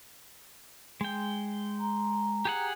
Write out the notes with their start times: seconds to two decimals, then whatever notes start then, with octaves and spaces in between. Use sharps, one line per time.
1.01 G#3 G5
1.80 A#5
2.45 G4 G#4 F#5